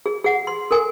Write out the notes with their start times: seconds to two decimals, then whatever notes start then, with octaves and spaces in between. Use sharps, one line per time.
0.06 G#4
0.24 G#4 F#5
0.47 C6
0.71 A4 A#4 G#5